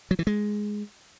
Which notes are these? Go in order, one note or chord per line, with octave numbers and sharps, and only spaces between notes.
F#3
E3
G#3